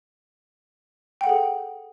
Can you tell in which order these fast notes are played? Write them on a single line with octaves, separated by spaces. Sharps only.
G5 F#5 A4 G#4